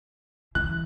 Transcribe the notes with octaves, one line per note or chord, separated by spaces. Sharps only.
E3 F#6